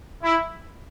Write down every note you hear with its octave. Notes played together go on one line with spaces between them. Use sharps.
E4